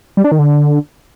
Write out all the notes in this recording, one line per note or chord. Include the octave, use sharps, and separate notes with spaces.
G3
D4
D#3
D3